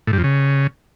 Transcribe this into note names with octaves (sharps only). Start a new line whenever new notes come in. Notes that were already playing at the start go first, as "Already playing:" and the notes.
A2
G2
F2
C#3